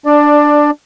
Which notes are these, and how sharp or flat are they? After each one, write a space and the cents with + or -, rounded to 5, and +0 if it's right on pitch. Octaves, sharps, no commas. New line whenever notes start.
D4 +0 D5 +15